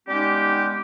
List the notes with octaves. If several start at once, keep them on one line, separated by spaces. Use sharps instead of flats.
G3 G#3 B3 C#4 D#4 G4